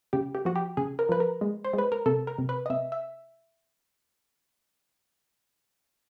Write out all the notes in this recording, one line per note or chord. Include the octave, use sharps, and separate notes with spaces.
C#3 G4
G4
F3 F#4
G4
C#3 G#4
A#4
F3 B4
A#4
G#3
C5
G#3 B4
A#4
C3 A4
A#4
C3
B4
D#5
C3 E5
E5